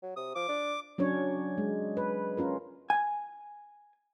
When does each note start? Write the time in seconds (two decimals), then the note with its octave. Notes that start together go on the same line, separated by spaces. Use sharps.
0.03 F#3
0.16 C3 D#6
0.35 F3 D6
0.49 D4
0.98 F#3 C#4 D4 C#5
1.58 G#3
1.97 B4
2.37 C#4 F4 A#4
2.90 G#5